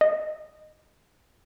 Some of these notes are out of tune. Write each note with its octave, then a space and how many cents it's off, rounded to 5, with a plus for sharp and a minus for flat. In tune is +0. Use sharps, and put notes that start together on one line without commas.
D#5 -15